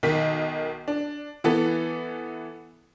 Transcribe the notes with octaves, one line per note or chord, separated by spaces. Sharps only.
B1 D#3 B6
D4
E3 B3 A4